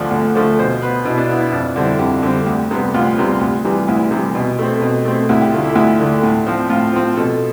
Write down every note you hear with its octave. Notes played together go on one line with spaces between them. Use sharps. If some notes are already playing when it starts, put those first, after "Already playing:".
Already playing: D2 D3 F3 A3 D5
D2
D3 F3 A3
B2 C5
B3 B4
B2 E4
D4
B3 E4
E4
F2 D4
D3 G3 C4 E4
F2 G4
D3 G3 C4
D2
C3 G3 B3
D2 F4
C3 G3 B3
D2
C3 E3 G3
D2 E4
C3 E3 G3
B2
A3 C4
B2
A3 C4
D2 E4
G4
D3 A3 F4
E4
D2 E4
D3 A3
A2
F3 C4
A2 F4
F3 C4
B2 A4